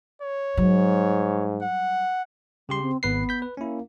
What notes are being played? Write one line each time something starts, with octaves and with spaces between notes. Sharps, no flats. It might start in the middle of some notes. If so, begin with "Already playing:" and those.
C#5
G#2 F#3 G3
F#5
C#3 G3 G4 C6
C4
G#1 B3 B4 C7
G6 B6
B4
A#3 C#4 E4